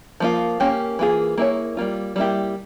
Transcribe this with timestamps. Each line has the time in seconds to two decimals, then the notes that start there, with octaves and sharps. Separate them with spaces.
0.20 F3 A#3 F4
0.60 A#3 C#4 G4
0.99 E3 A#3 F4 G#4
1.37 A#3 E4 G#4 C#5
1.77 G3 A#3 F4
2.16 G3 A#3 E4 G4